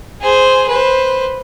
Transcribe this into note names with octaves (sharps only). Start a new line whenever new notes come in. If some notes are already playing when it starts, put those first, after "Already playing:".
G#4 C5
B4 C5